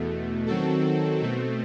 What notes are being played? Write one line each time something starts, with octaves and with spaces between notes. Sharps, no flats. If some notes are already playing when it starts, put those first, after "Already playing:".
Already playing: E2 B2 A3
D#3 F#3 C4 F#4 A4
B2 A3 C4